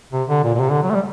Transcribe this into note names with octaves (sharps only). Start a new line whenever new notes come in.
C3
D3
A#2
A#2
C3
D3
F#3
A3
G3